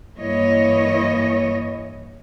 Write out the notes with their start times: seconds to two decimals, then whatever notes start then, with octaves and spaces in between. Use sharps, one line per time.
0.16 G2 E3 A#3 E4 C#5 D#5